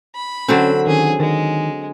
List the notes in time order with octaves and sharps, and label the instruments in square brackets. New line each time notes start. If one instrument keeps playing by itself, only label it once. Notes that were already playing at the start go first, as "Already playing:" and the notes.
[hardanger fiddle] B5
[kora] D3 F#3 C4 [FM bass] C#4
[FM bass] D#3 [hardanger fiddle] C#4 G#4
[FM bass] D#3 [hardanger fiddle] G#3